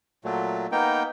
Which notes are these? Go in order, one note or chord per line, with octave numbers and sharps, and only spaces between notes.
A#2 F#3 A3
A#3 B3 D#4 G5